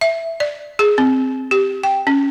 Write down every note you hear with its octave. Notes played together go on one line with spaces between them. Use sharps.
E5
D5
G#4
C4
G4
G5
C#4